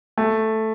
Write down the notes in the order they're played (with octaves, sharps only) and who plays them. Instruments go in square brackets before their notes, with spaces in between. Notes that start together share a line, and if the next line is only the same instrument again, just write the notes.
[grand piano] A3